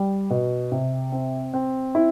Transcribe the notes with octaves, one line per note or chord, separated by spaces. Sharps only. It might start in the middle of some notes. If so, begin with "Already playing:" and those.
Already playing: G3
B2
C3
C4
C4
E4